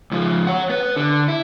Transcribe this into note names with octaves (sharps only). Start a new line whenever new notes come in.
C#2 F3
C#5 F#5
B3 B4
D3
E4